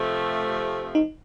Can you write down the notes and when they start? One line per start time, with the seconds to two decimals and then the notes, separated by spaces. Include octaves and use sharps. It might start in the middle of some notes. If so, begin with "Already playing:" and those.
Already playing: C3 F3 A3
0.95 D#4